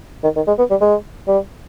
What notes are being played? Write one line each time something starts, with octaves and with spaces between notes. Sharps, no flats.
D#3
D#3
G#3
B3
G3
G#3
G3